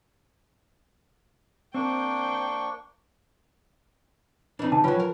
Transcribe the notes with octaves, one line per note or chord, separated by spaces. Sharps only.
A#3 C4 D4 C5 G5 C#6
E3 C4 D4 D#4
C#3 G#5 A5
F3 F#3 C#4 F4 B4 G5
F3 A#4